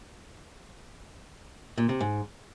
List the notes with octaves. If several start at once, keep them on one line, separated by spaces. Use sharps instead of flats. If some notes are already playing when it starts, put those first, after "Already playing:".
A#2
C3
G#2